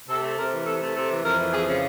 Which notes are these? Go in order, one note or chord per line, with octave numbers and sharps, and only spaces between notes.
C3 A4
A3
C3 A#4
E3
C3 A4
A3
C3 A4
E3
F2 A#4
E3
F2 G#4
C#3